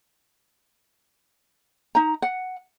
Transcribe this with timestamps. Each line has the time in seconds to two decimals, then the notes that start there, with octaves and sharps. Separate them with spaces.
1.95 D#4 A#5
2.22 F#5